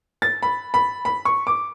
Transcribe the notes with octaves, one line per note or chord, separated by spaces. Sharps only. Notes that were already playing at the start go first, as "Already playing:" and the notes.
A6
B5
B5
B5
C#6
D6